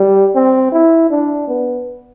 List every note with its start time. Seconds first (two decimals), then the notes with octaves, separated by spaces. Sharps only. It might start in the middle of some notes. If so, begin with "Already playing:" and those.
Already playing: G3
0.35 C4
0.72 E4
1.10 D4
1.48 B3